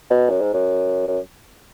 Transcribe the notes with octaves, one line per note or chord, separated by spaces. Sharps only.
B2
F#2
G#2
F#2
F#2